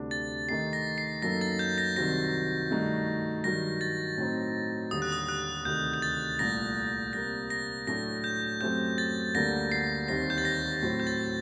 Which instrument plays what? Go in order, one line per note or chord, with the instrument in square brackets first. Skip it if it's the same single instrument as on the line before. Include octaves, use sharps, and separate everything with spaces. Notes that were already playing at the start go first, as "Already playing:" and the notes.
Already playing: [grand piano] D2 C3 G3 D4
[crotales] A6
[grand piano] D#3 A3 D#4 G4 [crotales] C7
[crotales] A#6
C7
[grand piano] F#2 F#3 A#3 D#4 A4 [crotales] A#6
[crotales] A6
G6
A#6
[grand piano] C2 C3 D#3 F#3 C4 [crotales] A#6
[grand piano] G2 D#3 A3 D#4 F#4
[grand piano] G2 D#3 F#3 [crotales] A#6
[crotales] A6
[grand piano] A2 F#3 C4 D#4
[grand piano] D#2 D3 G3 [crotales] D#6
[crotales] F#6
D#6
F#6
[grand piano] D2 C3 D#3 [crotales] G6
[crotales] G6
A6
[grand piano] C2 A#2 A3 [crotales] A#6
[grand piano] C3 G3 A#3 [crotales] A#6
[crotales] A#6
[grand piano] A2 F#3 A3 D4 [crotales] A#6
[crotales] G6
[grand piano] F#2 F#3 A3 C4 G4 [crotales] G6
[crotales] A6
[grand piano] D2 D3 G3 A#3 [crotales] A#6
[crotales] C7
[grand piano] D#2 D#3 G3 C4 [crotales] A#6
[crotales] G6
A6
A#6
[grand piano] A2 F#3 C4
[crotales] G6
A6